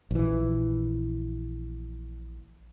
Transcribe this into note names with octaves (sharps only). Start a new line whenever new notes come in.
A#1 E3